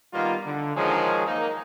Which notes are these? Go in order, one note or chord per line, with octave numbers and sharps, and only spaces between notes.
D#3 G3 A#3 B3 F4
D3
D#3 F3 F#3 G#3 G#4 C#5
A#3 D#4